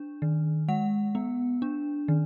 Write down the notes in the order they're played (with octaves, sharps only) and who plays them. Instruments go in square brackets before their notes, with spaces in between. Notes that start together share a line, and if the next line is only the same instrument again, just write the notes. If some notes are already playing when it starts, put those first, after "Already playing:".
Already playing: [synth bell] D4
D#3
G#3 F#5
B3
D4
D#3